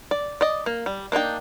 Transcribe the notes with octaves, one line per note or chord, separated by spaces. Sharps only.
D5
D5 D#5
A#3
G3
A#3 D4 D#4 G5